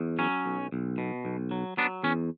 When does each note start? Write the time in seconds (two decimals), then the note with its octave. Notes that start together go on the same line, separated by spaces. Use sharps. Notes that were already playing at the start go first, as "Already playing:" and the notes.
Already playing: E2
0.19 F#3 C#4
0.46 B1
0.72 B1
0.98 B2
1.25 B1
1.51 F#3
1.77 F#3 B3 D4
2.03 E2 C#4